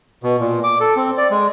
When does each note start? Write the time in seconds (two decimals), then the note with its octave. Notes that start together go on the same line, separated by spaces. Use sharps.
0.23 B2
0.40 A#2
0.64 D6
0.80 A4
0.96 C4
1.18 D5
1.31 G#3